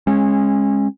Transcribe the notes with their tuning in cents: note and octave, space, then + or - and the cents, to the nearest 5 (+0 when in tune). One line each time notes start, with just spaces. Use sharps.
G#3 -10 C#4 -25